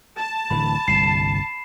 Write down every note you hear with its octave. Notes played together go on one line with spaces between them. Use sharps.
A5
D1 D2 E3 B5
G1 C2 C7 E7